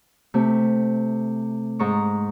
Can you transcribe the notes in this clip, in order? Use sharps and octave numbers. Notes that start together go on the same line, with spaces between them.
C3 A3
G#2 A#5 C#6